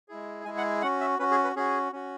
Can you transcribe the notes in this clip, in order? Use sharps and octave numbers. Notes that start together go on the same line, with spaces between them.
G#3 E4 G#4
G#3 E4 G#4 G#5
F#5
C#4 F#4 F#5
E5
C#4 F#4 B4
G#4
B4
C#4 F#4 G#4
C#4 F#4